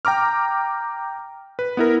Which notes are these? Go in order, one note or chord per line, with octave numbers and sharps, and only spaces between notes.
G5 A#5 D6 F6
B4
B3 E4 A#4